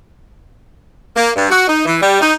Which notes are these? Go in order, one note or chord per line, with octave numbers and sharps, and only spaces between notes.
A#3
G2
F#4
D#4
E3
G3
D#4